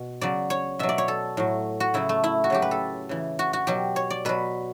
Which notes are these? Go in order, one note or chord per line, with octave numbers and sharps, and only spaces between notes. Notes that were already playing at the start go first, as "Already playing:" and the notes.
Already playing: B2
C#3 F#3 D5
C#5
B2 F#3 E5
D5
C#5
A4
A2 F#3
F#4
C#3 F#3 E4
A3
E4
F#4
C#3 F#3 G4
B4
A4
C#3 E3
F#4
F#4
B2 F#3 G4
C#5
D5
B2 F#3 B4